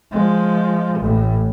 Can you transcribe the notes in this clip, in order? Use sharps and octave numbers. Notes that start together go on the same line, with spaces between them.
F3 G#3
A1 A2